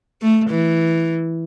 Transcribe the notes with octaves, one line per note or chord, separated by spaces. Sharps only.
A3
E3